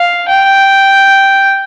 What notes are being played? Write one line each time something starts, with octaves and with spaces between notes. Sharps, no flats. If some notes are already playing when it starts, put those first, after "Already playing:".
Already playing: F5
G5